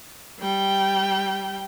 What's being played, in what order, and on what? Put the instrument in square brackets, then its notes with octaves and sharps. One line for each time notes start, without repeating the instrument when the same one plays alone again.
[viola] G3 G5